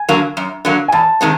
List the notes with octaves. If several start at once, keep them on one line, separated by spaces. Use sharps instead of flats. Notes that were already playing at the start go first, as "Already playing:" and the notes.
Already playing: G#5
D3 F#3 A#3
F#2
D3 F#3 A#3
G#5
E2 A5
C3 D#3 G#3 C4